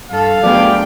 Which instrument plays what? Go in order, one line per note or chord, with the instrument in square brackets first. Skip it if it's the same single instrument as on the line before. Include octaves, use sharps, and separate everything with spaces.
[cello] G2 A4 [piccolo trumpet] F5
[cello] D2 G5 [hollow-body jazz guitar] F#3 B3 G#4 [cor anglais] D5